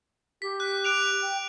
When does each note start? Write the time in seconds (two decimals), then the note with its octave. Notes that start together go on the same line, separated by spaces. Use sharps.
0.42 G4 B6
0.60 F#6
0.84 F#6 D7 F7
1.22 G5